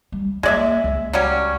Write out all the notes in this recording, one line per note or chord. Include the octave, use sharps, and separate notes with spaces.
G3
G#3 A#3 D5 E5
C#2
F#3 G3 C#4